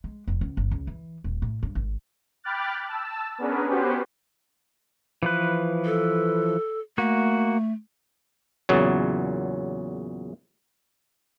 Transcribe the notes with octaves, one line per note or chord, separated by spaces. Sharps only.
G#3
F1
C#2
G1
C#2
E3
D#1
A2
G2
G#1
G5 B5 D6 F6 F#6 A6
A5 E6
B3 C#4 D4 G#4 A#4 B4
B3 C#4 F#4 G4 B4 C5
E3 F3 B4
A4
A3 A#3 F#4
E2 A#2 C#3 F#3